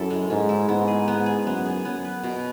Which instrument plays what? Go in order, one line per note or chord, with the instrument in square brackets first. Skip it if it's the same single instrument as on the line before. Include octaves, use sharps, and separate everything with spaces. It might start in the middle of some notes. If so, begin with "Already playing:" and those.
Already playing: [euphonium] F#2 [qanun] E4 A4
[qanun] G#3
[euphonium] G#2 [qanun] C#4
[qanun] E4
[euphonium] G#2 [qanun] B3
[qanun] G#4
B3
G#4
[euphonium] F#2 [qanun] B3
[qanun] G#4
[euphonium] F#2 [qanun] B3
[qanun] B4
B2